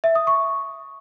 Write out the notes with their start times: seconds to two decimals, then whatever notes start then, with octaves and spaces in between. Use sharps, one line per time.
0.04 E5
0.15 D#6
0.27 C#6